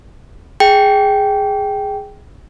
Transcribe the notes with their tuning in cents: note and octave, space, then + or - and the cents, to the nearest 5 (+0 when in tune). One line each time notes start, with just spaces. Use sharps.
G#4 +0 G5 -5